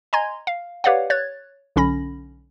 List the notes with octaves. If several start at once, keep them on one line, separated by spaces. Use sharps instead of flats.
D#5 G#5 A#5 C6 G#6
F5
G4 B4 C#5 D5 F5 F#5
C#5 F#6 G#6 A6
B1 D3 C#4 B5 A#6